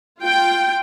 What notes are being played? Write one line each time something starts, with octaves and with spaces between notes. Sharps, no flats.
F4 G5